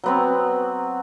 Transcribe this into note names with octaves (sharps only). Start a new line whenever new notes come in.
F#3 B3 C4